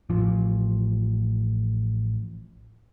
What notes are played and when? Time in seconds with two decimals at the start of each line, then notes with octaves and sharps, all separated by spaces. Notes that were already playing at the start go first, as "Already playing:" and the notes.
0.10 A1 F3